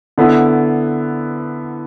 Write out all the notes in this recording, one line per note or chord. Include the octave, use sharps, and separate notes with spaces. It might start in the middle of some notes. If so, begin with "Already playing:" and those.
D3 B3 E4